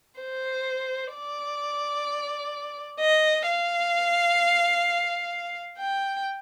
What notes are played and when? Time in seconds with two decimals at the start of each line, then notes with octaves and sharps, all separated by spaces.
0.21 C5
1.14 D5
3.00 D#5
3.47 F5
5.78 G5